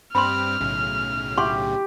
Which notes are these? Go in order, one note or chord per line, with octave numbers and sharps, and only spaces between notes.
G2 C4 G4 B5 C6 F6
B1 A2 C#3
G4 C6 C#6